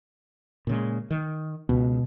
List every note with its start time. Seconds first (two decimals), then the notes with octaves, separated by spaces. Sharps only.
0.67 A#2 C#3 G#3
1.11 D#3
1.69 C#2 B2